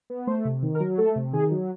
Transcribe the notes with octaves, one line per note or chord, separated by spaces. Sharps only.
B3
A3 C5
C3
D#3
A#4
F#3
A3 A4
C3
D#3 G#4
F#3